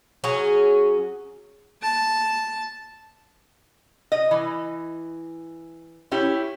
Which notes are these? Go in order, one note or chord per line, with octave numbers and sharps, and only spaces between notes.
F#3 C#4 G#4
A5
D#5
E3
C#4 E4 G4